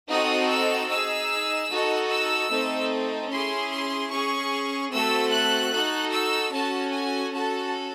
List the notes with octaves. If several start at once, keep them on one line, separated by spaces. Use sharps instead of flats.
C4 D#4 F#4 A4 D#6
E6
D#4 G#4 E6
D#4 F#4 A4
E6
A3 C4 D#4 A4
C#4 E4 G#4 C6
C6
C#4 G#4 C#6
A3 C4 F#4 A4 E6
F#6
D#4 F#4 A4
E6
C#4 F#4 A4 A5
G#5
C#4 F#4 A4 A5